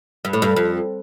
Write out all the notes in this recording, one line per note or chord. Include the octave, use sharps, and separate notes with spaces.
G2
A2
G2
F2